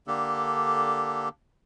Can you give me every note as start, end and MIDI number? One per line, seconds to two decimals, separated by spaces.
0.07 1.29 50
0.07 1.29 58
0.07 1.29 62
0.07 1.29 67
0.07 1.29 69